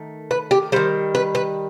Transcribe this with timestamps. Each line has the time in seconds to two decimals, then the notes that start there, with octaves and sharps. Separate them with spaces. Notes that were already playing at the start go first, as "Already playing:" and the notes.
Already playing: D#3 A3
0.31 B4
0.51 G4
0.72 D#3 G3 C5
1.15 B4
1.35 B4